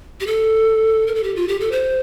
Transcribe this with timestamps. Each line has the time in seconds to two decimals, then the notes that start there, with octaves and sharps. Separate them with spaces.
0.20 G4
0.27 A4
1.07 A#4
1.15 A4
1.23 G4
1.36 F4
1.48 G4
1.60 A4
1.71 C5